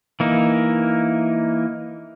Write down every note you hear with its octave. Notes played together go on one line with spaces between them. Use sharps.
E3 A#3 D#4